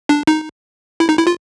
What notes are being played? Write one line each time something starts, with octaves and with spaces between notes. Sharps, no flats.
D4
D#4
E4
D#4
E4
F4